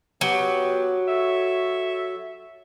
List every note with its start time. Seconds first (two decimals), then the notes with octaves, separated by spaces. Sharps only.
0.21 F#3 B3 G4
1.08 A4 C#5 E5